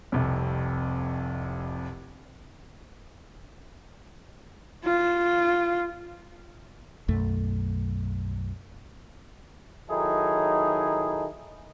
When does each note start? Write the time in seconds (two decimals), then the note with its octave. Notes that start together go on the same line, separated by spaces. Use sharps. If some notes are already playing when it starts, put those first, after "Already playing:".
0.12 F1 C2 F2
4.84 F4
7.08 B1 F#2 A3
9.90 D#3 F#3 D#4 E4 G#4 A4